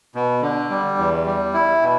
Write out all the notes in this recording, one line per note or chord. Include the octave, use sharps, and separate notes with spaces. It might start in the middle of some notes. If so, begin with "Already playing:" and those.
B2
D3
G3
E2
G3
E4
B2